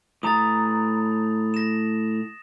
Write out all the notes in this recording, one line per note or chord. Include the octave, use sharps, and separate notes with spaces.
A2 A#5 D#6 A6
A#6 E7